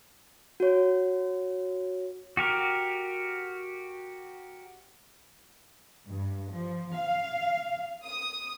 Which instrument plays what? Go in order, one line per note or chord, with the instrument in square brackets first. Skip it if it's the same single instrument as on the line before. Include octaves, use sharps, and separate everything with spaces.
[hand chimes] F#4 C#5
[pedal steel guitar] F#4 G4 A#4
[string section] G2
F3
F5
D#6